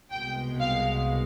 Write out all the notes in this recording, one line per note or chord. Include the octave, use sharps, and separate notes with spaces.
C2 B2 G#3 G5
F5